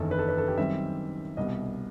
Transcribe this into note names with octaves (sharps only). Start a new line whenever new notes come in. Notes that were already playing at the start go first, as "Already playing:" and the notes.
Already playing: F#1 E2 D#3 A4
B4
A4
B4
A4
G4
F#2 D#3 G3 C4 E5
C2 B2 G3 D#5